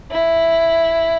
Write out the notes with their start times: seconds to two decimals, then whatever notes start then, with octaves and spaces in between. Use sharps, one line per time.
0.11 E4